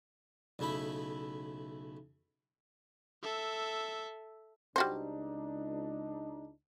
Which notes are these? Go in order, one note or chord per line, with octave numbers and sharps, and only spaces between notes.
B1 C#3 A3 E4 B5
A4 E5
C#2 G3 D4 D#4 F#4 C5